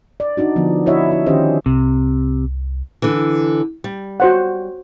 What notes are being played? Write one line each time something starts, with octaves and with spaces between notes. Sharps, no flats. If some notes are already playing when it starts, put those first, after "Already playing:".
D5
D4 D#4 F#4
D3 F3 B3
E4 F#4 C#5 D#5 E5
E4
D#3 C#4 G4 C5 D#5
C2 C3
D3 E3
G3
F#4 C5 F#5